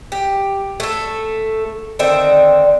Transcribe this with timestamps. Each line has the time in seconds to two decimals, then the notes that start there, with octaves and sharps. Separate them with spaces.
0.12 G4
0.80 A3 A4
1.99 D3 D#3 C4 E5